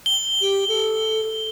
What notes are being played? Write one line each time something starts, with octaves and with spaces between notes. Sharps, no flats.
G7
G4
A4